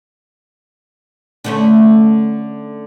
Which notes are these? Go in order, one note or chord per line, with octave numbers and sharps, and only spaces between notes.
D3 A3 C#4